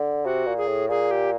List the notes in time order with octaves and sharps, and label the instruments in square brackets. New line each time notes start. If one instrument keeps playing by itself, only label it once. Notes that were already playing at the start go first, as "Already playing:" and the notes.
Already playing: [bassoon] D3
[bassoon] C3 [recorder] F#4
[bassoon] A#2
[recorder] G#4
[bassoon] A2
[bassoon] A#2 [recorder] G#4
[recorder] G4